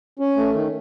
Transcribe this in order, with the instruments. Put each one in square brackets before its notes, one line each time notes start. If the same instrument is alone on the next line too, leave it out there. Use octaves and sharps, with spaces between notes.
[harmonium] C#4
A3
D#3